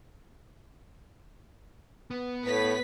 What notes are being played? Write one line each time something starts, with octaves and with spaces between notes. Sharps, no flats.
B3
A2 B4 B6